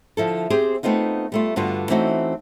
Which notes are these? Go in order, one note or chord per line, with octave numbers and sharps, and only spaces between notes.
D3 F3 E4 A4
C4 G4 G#4 C5
A3 B3 C4 D#4 F4
G3 A3 F4
G2 D3 B3 F4 F#4
E3 A3 C4 C#4 D#4 F#4